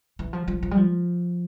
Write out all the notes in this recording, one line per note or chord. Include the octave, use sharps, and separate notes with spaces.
E3
F3
F3
F3
G3
F3